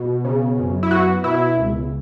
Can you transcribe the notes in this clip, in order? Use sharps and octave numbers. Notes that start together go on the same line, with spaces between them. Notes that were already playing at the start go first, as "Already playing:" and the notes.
Already playing: B2
C#3
F#2
E4
B3 F#4
B2 E4
C#2